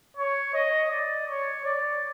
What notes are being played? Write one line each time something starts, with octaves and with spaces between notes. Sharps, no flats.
C#5
D#5
D5
C#5
D5